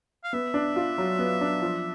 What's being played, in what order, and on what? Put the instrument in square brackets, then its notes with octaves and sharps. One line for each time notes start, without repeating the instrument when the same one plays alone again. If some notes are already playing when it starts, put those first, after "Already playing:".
[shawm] F5
[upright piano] B3 [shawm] E5
[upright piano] D4
F4
F#3
B3
D4
F3